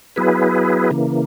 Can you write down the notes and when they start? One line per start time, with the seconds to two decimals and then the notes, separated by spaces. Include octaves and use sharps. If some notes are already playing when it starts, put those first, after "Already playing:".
0.16 F#3 B3 E4 G#4 B4
0.91 C#3 E3 A#3